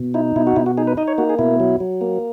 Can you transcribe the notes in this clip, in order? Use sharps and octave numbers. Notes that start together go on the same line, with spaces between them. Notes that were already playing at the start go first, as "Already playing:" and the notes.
Already playing: B2
D#4 E4
B2 E4
F#4
B2 E4
F#4
D#4 G#4
B4
D#4 D#5
C#5
A#3 F#4
G#4
B2 E4
F#3
F#3
A#3